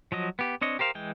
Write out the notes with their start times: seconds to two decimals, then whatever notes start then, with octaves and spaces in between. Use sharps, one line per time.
0.12 F3 F#3 D#5
0.39 B3 G4
0.61 C4 D4 C#5 D#5
0.79 G4 A#4 C5 F5
0.95 E3 G#3 G5